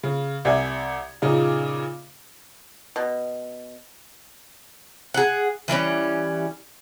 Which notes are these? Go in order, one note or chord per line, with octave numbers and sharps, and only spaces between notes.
C#3
C2 D5 E5 G#5 G#6
A#2 C#3 D#4
B2
G#4 F#5
E3 G3 A3 C#4